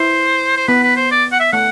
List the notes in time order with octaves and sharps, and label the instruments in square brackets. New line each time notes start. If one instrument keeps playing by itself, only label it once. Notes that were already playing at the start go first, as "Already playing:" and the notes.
Already playing: [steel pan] E4 [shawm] C5
[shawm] C5
[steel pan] B3 [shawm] B4
[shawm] B4
C5
D5
F#5
E5
[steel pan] A3 [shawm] F#5